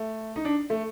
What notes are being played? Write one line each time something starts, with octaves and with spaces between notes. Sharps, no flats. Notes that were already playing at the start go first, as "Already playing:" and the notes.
Already playing: A3
D#4
D4
A3